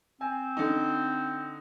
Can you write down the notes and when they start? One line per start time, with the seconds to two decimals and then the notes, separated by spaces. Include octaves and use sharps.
0.21 C4 G#5
0.57 D3 D#4